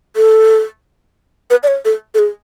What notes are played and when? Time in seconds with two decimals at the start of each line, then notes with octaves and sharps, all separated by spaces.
0.16 A4
1.51 B4
1.63 D5
1.68 C#5
1.85 A4
2.15 A4
2.19 G#4